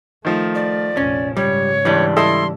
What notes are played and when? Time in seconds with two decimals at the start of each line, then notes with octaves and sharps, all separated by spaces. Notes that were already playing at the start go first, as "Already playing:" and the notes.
0.25 D#3 F3 A3
0.55 D5
0.97 F1 A#1 C#4
1.37 G#2 C#3 G3 C#5
1.85 E3 G3 D4
2.17 E4 A4 D#5 C6